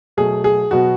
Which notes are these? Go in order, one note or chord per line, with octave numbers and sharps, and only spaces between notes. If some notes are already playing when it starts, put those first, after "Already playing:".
B2 F#3 A3 G#4
G#4
B2 F#3 B3 F#4